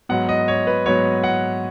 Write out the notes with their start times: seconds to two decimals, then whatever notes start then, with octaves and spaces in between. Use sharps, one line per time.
0.09 G#2 F#3 B3 F#5
0.29 D#5
0.48 C#5
0.67 B4
0.86 G#2 F#3 B3 C#5
1.24 F#5